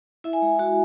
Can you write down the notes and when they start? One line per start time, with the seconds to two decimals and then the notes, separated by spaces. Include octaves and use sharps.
0.24 E4 E5
0.33 G#5
0.42 G#3
0.59 G#3 F#4